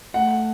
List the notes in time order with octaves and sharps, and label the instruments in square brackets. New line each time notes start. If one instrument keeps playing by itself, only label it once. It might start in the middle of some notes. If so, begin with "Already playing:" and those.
[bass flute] A3 [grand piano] F#5